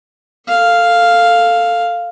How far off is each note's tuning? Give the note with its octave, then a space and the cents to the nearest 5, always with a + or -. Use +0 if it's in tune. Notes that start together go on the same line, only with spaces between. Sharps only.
A4 +15 F5 +0